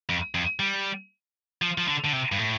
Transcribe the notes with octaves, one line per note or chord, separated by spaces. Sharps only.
F2
F2
G3
F3
F3
D3
D3
C3
G2
A2